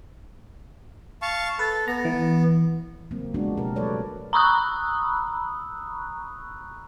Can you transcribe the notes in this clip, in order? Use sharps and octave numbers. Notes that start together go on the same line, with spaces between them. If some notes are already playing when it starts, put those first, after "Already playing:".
F5 A5 C#6
A4 B4
B3 A#5
E3
C#3 F#3 A#3 C4
F3 G#3 B3 D4 F#4
B2 G4 A#4
F#3 A3 A4 B4 C#5 D5
A#5 B5 C#6 D#6 E6 F#6